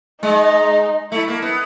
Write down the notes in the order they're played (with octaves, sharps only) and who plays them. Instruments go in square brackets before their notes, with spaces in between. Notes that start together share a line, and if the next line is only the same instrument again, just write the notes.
[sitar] G#3 [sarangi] D#4
[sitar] A3 [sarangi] E4
[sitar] A#3
B3